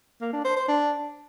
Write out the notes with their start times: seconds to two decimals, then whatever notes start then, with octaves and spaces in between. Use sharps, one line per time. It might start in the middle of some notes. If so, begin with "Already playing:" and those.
0.21 A#3
0.33 D4
0.45 C5
0.56 C5
0.68 D4